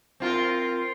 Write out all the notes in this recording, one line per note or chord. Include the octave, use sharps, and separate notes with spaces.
C4 F4 A#4